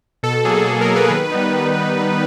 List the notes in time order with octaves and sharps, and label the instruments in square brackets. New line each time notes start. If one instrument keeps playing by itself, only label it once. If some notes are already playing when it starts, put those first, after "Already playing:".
[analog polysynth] B2 A4
F#3 A#3 G#4
B2 A4
A#4
F#3 A#3
B4
D#3
G3 B3 D#4
D#3